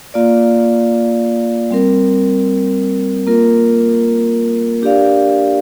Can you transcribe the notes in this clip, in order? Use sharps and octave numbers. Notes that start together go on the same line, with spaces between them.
A#3 F4 D5 F5
G3 C4 A#4
A#3 F4 A#4
D4 G4 A#4 D5 F5